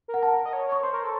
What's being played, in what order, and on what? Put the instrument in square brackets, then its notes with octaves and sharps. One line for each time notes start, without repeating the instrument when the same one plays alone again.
[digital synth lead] A#4
[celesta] F#5
A5
[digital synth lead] D#5
C#5
[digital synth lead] C#5 [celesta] C#6
[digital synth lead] C5 [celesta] C6
[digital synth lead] A#4
A4